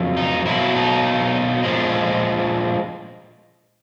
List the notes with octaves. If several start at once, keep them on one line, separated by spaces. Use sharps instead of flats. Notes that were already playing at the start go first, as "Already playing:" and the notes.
Already playing: F2 C#3 F#3 A#3
D#4
B2 F#3 A#3 E4
D#4
A#2 F3 G#3